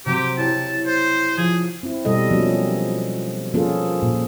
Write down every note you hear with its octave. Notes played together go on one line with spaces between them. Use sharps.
C3 F#3 C4 G4
E4 G4 C#5 A5
C5
F3 G#4 G#6
C4 E4
B2 G3 A4 D#5
F3 F#3 A#3 C#4
F3 A#3 C#4 F4 G#4 A4
A#2